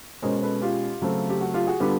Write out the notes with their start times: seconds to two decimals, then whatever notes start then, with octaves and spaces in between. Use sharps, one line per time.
0.22 B2 G#3 C#4 A#4 C5
0.42 A4 B4
0.61 F4 G4
1.01 C#3 F#3 A3 C4
1.29 G4
1.41 F#4
1.54 F4 G4
1.67 F#4 G#4
1.80 D3 G3 B3 D4 F4 G4